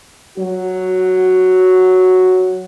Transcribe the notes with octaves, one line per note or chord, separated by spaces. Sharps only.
F#3 F#4